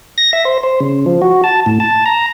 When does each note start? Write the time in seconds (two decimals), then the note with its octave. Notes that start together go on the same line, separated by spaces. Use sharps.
0.18 A#6
0.33 E5
0.45 C5
0.63 C5
0.80 C#3
1.06 F3
1.22 F#4
1.44 A5
1.66 A2
1.80 A5
2.06 A#5